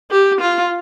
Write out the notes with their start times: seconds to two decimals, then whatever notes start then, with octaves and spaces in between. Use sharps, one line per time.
0.11 G4
0.41 F4